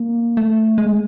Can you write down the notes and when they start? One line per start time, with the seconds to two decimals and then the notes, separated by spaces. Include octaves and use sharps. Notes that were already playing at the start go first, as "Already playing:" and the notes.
Already playing: A#3
0.37 A3
0.78 G#3